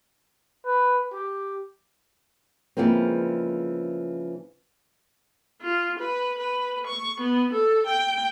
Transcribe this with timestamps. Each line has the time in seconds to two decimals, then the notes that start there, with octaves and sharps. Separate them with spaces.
0.66 B4
1.13 G4
2.77 C#3 E3 F3 G#3 A#3 C4
5.61 F4
5.99 B4
6.38 B4
6.87 C#6
7.20 B3
7.53 A4
7.86 G5